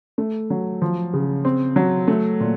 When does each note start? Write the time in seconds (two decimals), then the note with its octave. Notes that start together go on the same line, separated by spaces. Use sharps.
0.18 A3
0.50 F#3
0.82 F3
1.14 C#3
1.45 C4
1.76 F#3
2.08 A3
2.40 A#2